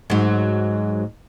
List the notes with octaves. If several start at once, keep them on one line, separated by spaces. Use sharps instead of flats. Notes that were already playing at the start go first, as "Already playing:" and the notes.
G#2 F#3